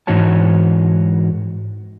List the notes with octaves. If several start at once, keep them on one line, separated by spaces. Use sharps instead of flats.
G#2 E3 D#4 F#4 C#5 A5